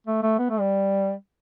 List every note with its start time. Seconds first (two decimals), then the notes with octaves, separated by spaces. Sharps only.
0.07 A3
0.23 A3
0.38 B3
0.50 A3
0.60 G3